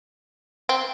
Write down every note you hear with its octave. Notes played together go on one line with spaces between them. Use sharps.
C4